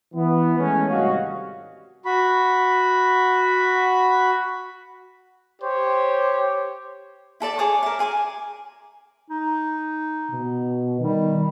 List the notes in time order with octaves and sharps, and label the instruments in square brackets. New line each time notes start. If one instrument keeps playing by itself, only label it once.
[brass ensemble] E3 B3
G#3 A3 C#4
G#1 C3 G3 F#4 D#5 F5
[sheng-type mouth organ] F#4 B5
[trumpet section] G4 C5 C#5
[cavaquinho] E4 A4 D5 A5
G#4 C#5 D6 D#6
A#4 E5
G#4 G#5 C#6 D6
[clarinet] D#4
[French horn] B2
[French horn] D#3 [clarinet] G3